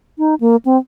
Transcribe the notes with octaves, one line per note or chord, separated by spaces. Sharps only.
D#4
A#3
C4